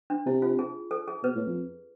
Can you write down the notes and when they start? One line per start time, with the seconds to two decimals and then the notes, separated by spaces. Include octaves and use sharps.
0.10 D4
0.26 C3 E4
0.42 F4
0.59 G#4
0.91 A4
1.08 G#4
1.23 B2 B4
1.35 A2
1.46 F2